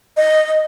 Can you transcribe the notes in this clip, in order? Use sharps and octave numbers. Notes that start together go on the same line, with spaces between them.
D#5